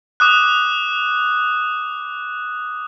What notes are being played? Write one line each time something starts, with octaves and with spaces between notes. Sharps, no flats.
D6 D#6 F#6